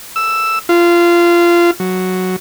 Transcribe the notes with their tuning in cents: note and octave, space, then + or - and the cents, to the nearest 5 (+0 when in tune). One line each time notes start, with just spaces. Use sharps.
E6 +5
F4 -20
F#3 +0